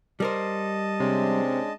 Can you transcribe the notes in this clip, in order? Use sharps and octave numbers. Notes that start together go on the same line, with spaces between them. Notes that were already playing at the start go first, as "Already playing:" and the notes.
G3 A#4 C5 D#5 A5
C3 G#3 C#4 D4